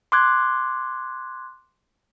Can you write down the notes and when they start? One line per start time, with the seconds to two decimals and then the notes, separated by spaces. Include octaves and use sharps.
0.12 C6 D6 F#6 G#6